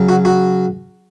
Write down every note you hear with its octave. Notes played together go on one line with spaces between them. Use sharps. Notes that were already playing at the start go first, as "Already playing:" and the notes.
Already playing: C#3 F#3
F#4
F#4